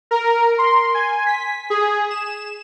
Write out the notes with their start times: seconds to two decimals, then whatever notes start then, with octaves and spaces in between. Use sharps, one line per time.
0.11 A#4
0.58 C6
0.94 G#5
1.27 B6
1.70 G#4
2.10 E7